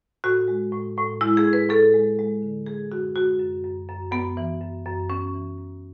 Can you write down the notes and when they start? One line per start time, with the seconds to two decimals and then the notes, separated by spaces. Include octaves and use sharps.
0.24 A2 F#4
0.48 G#3
0.72 A2
0.97 A2
1.21 G#3 E4
1.37 G#4
1.45 A2
1.53 B4
1.69 A2 A4
1.94 G#3
2.19 G#3
2.42 D3
2.66 G#3 G#4
2.91 F#2 F#4
3.16 G#3 F#4
3.39 F#2
3.64 F#2
3.89 F#2
4.12 F#2 B3
4.37 E3
4.61 F#2
4.86 F#2
5.10 F#2 C#4
5.34 E3
5.58 F#2